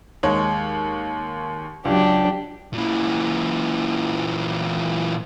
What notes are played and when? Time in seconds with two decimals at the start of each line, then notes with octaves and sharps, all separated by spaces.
0.23 D#2 G#3 C#5
1.85 C#2 F#3 D4 G4
2.73 A#2 E3